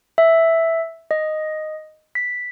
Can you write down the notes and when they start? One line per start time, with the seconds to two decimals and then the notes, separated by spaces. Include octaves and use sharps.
0.18 E5
1.11 D#5
2.15 B6